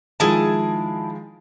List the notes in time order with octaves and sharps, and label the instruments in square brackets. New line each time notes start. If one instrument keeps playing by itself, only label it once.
[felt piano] D#3 F3 G#3 [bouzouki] E4 G#4 A5